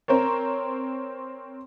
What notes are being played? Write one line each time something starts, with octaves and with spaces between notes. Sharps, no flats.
C4 A#4 C5 C#5